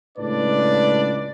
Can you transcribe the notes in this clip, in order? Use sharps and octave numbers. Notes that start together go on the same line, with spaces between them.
C#2 A2 D4 B4 D5